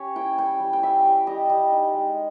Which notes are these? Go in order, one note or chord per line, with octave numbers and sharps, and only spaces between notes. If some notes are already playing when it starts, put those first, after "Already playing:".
Already playing: C#4 G4 C#5
E4 G5
G3 G5
G3
G5
G3 E5
G3
G3 D#5
G3
D#4
G#3